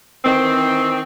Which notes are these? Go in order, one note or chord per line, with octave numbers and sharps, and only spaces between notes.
D#3 E3 C4